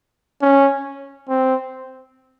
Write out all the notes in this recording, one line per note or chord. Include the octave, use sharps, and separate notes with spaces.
C#4
C4